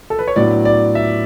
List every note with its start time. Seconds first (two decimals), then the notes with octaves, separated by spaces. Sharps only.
0.10 A4
0.19 B4
0.28 C#5
0.36 A2 F#3 B3 D4 D5
0.65 D5
0.95 E5